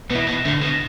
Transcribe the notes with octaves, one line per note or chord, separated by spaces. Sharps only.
B2 B3 E4
B2
A2 D3
B2